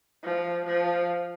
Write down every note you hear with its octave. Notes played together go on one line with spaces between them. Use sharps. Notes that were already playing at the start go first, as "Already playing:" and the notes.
F3
F3